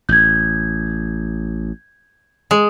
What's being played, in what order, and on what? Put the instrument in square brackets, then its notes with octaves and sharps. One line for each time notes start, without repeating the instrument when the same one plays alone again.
[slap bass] A1 [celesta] G6 G#6
[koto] G#3